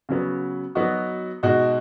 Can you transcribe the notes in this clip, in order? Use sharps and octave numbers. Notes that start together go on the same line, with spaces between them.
C#3 F#3 B3
F#3 B3 D#4 F#4
B2 G#3 D#4 F#4